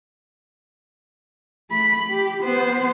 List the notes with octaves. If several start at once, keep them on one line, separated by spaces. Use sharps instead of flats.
A3 B5
G4
B3 C5